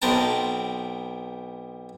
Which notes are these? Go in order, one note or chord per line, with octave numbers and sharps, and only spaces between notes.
B1 B3 C4 A#4 G5 A5